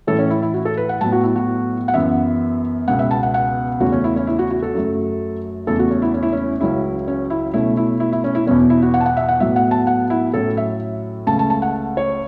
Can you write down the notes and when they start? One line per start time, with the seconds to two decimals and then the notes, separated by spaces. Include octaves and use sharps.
0.07 A2 E3 C#4 A4
0.19 C#4
0.30 E4
0.42 E4
0.54 F#4
0.65 A4
0.77 B4
0.89 F#5
1.01 A2 F#3 B3 A5
1.12 F#4
1.23 E4
1.36 F#4
1.88 F#5
1.94 F#2 E3 B3 E5
2.87 C#2 B2 B3 F#5
2.99 E5
3.11 A5
3.23 F#5
3.34 F#5
3.80 E2 C#3 A3 C#4 F#4
3.92 C#4
4.04 E4
4.16 C#4
4.27 E4
4.39 F#4
4.51 F#4
4.62 A4
4.74 F#2 F#3 A3
5.67 E2 C#3 A3 A4
5.79 F#4
5.91 C#4
6.02 E4
6.14 C#4
6.23 E4
6.33 C#4
6.61 C#2 C#3 F#3 C#4 E4
7.08 C#4
7.30 E4
7.53 B2 A3 C#4 E4
7.77 E4
8.00 E4
8.12 E4
8.24 C#4
8.35 E4
8.46 E2 B2 B3 C#4
8.70 E4
8.82 F#4
8.94 F#5
9.00 A5
9.06 F#5
9.17 E5
9.29 F#5
9.40 A2 F#3 B3 E5
9.56 F#5
9.71 A5
9.87 F#5
10.10 E4
10.34 A2 F#3 C#4 A4
10.57 E5
11.27 C#2 C#3 A3 A5
11.39 A5
11.50 A5
11.62 F#5
11.97 C#5